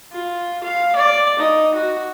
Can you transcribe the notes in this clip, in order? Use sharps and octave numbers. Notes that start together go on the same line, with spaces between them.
F4
F5
D5
D#4
F#4